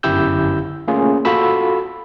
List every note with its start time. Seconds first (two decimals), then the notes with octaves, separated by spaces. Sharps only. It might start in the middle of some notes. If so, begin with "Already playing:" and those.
0.03 G1 F#2 E4 G4 E6 G6
0.88 A3 A#3 C#4 F4 G#4
1.25 F4 F#4 A4 B5 E6